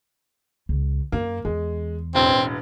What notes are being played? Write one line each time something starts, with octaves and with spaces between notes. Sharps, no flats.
C#2
F#2 A#3
E2 G#3
E1 A1 C4